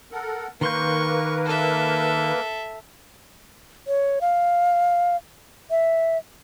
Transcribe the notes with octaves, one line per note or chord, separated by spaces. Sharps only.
A4 A#4 F#5
D#3 A#3 A#4 B4 C6 C#6 G6
A4 E5
C#5
F5
E5